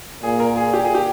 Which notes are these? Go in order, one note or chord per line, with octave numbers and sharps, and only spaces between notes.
A#2 G#4
A#4
G#4
G4
G#4
G4